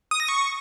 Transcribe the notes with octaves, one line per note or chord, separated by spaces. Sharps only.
D#6
A#6
C#6